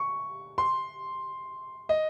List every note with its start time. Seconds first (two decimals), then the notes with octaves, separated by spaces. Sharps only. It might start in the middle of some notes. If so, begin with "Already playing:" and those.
Already playing: C#6
0.58 C6
1.89 D#5